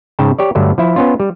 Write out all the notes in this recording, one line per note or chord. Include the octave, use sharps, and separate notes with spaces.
G#2 C#3 G5 A5
G4 C#5 D5
G2 D3 F#3 A3
F3 E4
B3 C#4 F4
G3